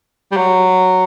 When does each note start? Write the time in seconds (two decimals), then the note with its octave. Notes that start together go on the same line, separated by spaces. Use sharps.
0.32 G3
0.37 F#3